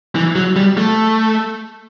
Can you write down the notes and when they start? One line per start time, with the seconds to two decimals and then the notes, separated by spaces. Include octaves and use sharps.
0.15 E3
0.36 F#3
0.56 G3
0.78 A3